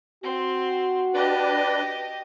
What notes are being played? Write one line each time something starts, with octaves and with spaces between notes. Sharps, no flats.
C4 F#4 C6
D4 G4 B4 D5 D#5